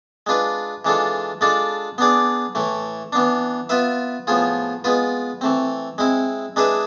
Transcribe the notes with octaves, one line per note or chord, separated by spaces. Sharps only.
G#3 D4 F4 B4
E3 G#3 D4 F4 A4
G#3 D4 F4 A4 D5
B3 D4 G#4 D5
A2 E3 A3
E3 B3 D4
B3 F4 B4 E5
A2 F3 B3 F4 G#4
G#3 B3 F4 B4
E3 A3 C4
G#3 C4 E4
G#3 D4 G#4 B4 E5